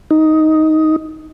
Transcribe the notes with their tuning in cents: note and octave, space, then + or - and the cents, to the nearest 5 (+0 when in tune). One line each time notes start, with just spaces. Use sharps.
D#4 +10